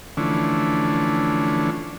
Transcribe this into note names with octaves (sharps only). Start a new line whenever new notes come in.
D3 E3 F3 A3 C#4 D4